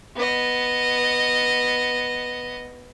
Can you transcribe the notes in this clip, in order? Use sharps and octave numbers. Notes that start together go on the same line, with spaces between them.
B3 D#5